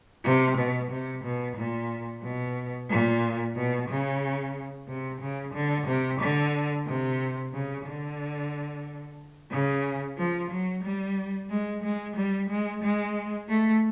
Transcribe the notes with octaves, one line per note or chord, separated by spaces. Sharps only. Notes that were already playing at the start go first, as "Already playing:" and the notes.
C3
B2
C3
B2
A#2
B2
A#2
B2
C#3
C3
C#3
D3
C3
D3
C3
C#3
D3
C#3
F3
F#3
G3
G#3
G#3
G3
G#3
G#3
A3